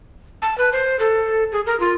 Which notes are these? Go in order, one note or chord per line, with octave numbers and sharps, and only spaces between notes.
A5
B4
C5
A4
G#4
A#4
F4